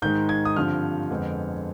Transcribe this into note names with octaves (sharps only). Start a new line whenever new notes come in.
G#2 D#3 G#3 G6
G#6
D#6
G2 D3 F3 C4 F6
F2 D3 G#3 B3